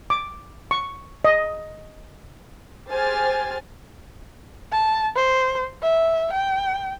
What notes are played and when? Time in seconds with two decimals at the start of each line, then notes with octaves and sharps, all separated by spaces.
0.10 D6
0.71 C#6
1.25 D#5
2.90 G4 G#4 C5 G#5 F6 A6
4.72 A5
5.16 C5
5.83 E5
6.33 G5